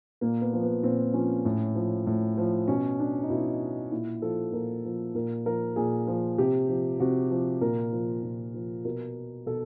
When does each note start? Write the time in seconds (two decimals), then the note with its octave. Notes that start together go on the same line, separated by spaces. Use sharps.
0.21 A#2 A#3
0.42 B3
0.53 F3
0.63 B3
0.83 A#2 C4
1.13 F3 C#4
1.45 A2
1.75 F3
2.07 A2
2.37 F3
2.68 B2 C#4
2.99 D4
3.23 D#4
3.30 B2 E4
3.91 A#2 E4
4.22 F3 A4
4.53 A#2 A#4
4.84 F3
5.15 A#2 A#4
5.46 F3 A#4
5.76 A#2 G#4
6.07 F3
6.38 C3 G4
6.68 F3
7.00 C3 F#4
7.30 F3
7.61 A#2 A#4
7.92 F3
8.23 A#2
8.54 F3
8.85 B2 A#4
9.46 B2 A4